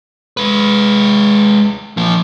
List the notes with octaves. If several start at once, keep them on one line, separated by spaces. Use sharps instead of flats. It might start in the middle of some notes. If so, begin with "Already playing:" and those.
G#3 B4
F3 A#3